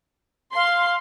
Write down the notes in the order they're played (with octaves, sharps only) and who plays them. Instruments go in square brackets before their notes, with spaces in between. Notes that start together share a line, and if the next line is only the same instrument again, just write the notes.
[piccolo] F5 [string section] C6